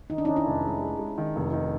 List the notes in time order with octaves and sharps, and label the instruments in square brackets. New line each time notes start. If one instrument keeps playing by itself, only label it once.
[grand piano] D#3 [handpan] D#4
[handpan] D4
C#4 D#4
[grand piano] D#3
[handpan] D4 E4
[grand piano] F1
G#3
G#3
G#3
D#3
F1
D#3